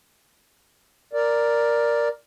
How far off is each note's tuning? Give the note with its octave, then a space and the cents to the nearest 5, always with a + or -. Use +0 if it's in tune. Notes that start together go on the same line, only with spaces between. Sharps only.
A#4 +5 D5 +0